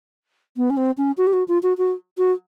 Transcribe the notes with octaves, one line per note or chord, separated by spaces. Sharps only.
B3
C#4
C4
C#4
F#4
G4
F#4
F4
F#4
F#4
F#4